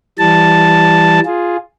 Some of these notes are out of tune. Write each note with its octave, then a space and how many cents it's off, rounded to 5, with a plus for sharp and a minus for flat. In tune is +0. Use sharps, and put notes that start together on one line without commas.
E3 +10 G3 +0 A5 +0
F4 +0 G#4 +0